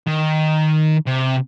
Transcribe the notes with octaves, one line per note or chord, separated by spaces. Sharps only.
D#3
C3